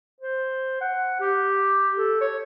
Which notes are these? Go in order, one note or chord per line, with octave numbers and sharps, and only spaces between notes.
C5
F#5
G4
A4
C#5